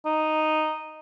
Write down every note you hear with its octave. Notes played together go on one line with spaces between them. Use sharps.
D#4